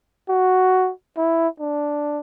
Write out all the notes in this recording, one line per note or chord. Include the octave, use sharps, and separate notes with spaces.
F#4
E4
D4